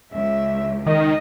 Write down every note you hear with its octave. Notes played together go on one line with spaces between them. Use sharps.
C#2 E5
D#3 D#5